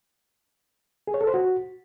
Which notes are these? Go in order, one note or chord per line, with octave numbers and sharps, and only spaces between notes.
G#4
C#5
A4
C5
F#4